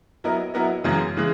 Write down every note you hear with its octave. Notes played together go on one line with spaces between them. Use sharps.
F#3 B3 E4 A#4 D#5
F#3 B3 E4 A#4 D#5
F#2 C#3 E3 G#3
C#3 E3 G#3